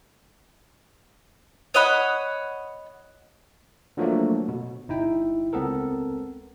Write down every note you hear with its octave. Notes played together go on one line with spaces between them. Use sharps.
C#5 D#5 F#5 B5
D3 F3 F#3 A3 A#3
B2
G1 D#4 E4 G5
C#2 B3 C4 A4 A#4